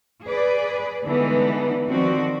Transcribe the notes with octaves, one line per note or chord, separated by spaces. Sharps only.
G#4 B4 D5
D3 E3 G3 G#3 B3 D#4
D#3 F3 C4 F#4 D5